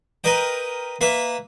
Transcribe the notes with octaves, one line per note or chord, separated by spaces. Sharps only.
A#4 B4 D#5 G5
A#3 B4 E5